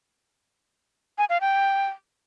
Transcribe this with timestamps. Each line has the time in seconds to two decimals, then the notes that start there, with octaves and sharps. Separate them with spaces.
1.18 G#5
1.30 F5
1.41 G5